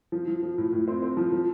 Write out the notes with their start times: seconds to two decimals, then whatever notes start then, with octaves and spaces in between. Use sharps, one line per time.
0.12 F3
0.28 F3
0.43 F3
0.58 A2
0.72 A2
0.88 C4
1.02 C4
1.17 F3
1.33 F3